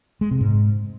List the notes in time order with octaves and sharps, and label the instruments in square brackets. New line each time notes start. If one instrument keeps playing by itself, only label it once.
[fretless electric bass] G#3
C3
G#2